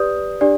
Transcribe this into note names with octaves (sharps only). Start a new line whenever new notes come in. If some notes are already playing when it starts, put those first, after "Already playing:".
Already playing: G4 B4 D5 D#6 G6
D4 G4 D5